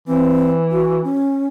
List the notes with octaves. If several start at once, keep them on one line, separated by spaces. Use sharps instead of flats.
E3 C4
F#4
C#4